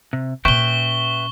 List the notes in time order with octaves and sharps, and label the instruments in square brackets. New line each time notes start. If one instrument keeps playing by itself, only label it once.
[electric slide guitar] C3
[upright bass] A#2 C#4 [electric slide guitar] B4 E5 G5 [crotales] C#6 G7